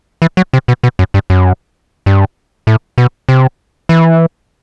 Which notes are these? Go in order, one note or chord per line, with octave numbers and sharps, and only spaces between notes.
E3
F#3
C3
B2
B2
F#2
G2
F#2
G2
A2
B2
C3
E3